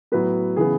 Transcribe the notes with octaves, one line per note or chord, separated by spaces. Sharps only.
A2 F#3 B3 B4
C#3 E3 B3 G#4